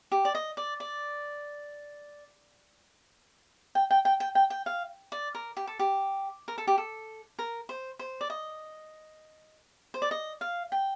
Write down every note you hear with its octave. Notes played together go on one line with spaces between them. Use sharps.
G4
D5
D#5
D5
D5
G5
G5
G5
G5
G5
G5
F5
D5
A#4
G4
A4
G4
A#4
A4
G4
A4
A#4
C5
C5
D5
D#5
C5
D5
D#5
F5
G5